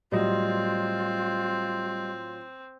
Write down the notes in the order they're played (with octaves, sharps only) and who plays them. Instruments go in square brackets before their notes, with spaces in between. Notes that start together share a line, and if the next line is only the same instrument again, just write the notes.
[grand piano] A2 F#3 [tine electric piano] G3 D#5 [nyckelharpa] C4 [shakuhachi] F4